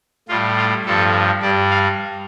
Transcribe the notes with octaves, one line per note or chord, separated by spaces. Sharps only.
A2 G3 F4
F4
G2 F3 A4
G2 G3 D5
F5